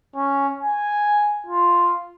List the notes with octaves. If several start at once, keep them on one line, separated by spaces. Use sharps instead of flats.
C#4
G#5
F4